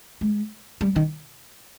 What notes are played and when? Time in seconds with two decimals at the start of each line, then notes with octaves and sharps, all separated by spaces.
0.21 G#3
0.81 G3
0.96 D#3